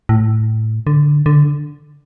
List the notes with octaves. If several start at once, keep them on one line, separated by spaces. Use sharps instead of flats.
A2
D3
D3